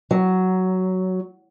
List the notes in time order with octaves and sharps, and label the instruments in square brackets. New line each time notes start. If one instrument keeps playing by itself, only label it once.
[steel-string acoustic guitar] F#3